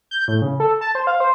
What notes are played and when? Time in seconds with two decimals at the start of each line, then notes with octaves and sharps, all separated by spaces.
0.11 G6
0.28 A2
0.42 C#3
0.60 A4
0.81 A5
0.95 C5
1.07 F5
1.20 C5